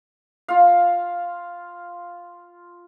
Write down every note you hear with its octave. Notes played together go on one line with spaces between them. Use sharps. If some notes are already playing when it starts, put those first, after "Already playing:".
F4 F5